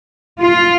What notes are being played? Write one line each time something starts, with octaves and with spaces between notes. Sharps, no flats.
F4